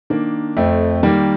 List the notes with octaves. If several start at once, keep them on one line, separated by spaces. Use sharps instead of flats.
D#3 A#3 D4
F2 A3 C4
D#3 G3 A#3